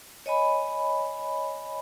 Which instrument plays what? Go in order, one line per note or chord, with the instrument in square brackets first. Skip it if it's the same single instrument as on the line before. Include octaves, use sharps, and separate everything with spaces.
[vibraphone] C#5 D#5 G#5 B5